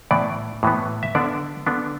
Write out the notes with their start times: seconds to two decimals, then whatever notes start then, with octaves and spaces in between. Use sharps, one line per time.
0.11 A2 E3 B3 D5
0.63 A2 E3 B3
1.03 E5
1.15 D3 B3 D4 D5
1.66 D3 B3 D4